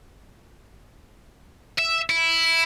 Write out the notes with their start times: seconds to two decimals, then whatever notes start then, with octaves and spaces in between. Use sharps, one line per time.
1.78 E5
2.10 E4